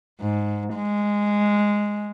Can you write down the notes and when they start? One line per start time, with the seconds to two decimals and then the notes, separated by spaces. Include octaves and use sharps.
0.21 G#2
0.75 G#3